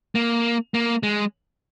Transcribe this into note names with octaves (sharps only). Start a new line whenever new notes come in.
A#3
A#3
G#3